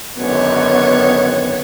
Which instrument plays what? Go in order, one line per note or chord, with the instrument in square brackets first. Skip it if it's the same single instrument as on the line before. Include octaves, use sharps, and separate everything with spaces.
[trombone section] G#1 F#2 D3 [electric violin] B3 C#5